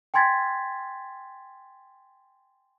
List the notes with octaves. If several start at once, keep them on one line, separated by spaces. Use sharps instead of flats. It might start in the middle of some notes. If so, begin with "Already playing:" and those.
G5 G#5 C6 G#6 A6 B6